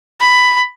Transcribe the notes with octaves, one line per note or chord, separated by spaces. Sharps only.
B5